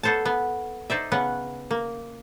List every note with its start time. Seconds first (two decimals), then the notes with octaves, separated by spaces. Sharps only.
0.03 B3 A4 C5 C#5 A5
0.25 B3
0.90 D#4 C5 D5 E5
1.12 C#3 B3 C#4 F#5
1.71 A#3